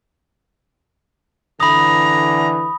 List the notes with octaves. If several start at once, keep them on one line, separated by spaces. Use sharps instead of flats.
D3 E3 A#5 B5 D#6